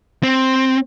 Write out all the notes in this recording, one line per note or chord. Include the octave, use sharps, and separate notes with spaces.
C4